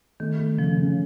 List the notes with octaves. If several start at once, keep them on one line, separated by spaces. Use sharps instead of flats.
D#3 A3
A3
C#3 F3
C#3